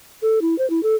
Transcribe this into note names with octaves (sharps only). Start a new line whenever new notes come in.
A4
E4
C5
E4
A4